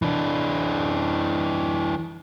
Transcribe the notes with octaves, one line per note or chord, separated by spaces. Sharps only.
E3 D4